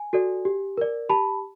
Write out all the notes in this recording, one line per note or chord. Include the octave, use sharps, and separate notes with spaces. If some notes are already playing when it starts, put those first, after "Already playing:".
Already playing: G#5
F#4 A4 D5
G4
A#4 D5
G4 A5 B5